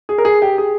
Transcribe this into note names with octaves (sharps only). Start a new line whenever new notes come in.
G#4
A#4
G#4
G4
G#4